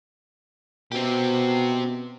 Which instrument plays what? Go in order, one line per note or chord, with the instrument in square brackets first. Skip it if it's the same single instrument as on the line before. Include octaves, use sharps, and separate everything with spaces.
[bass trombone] B2 [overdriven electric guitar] C4 G4